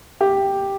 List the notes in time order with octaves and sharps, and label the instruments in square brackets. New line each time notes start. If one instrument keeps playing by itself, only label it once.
[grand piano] G4